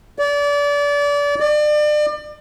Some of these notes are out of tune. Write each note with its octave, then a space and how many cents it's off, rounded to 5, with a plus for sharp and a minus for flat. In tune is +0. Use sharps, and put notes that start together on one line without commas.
D5 -30
D5 +35